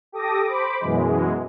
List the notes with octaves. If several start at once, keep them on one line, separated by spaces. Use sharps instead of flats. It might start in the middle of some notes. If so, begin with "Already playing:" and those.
G4 A4 D6 D#6 A#6
C5 B5 D6
F#2 B2 E3 G#3